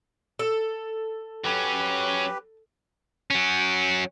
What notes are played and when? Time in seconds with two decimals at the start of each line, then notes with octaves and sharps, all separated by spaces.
0.39 A4
1.44 F#3 C#4 G4 B4
3.30 F#3 C#4